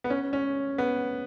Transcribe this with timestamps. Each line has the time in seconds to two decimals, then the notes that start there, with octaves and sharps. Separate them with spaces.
0.04 B3
0.10 C#4
0.33 C#4
0.78 B3